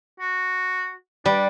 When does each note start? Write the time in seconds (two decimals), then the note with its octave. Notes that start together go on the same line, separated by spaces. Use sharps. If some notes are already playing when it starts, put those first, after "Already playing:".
0.20 F#4
1.26 G3 D4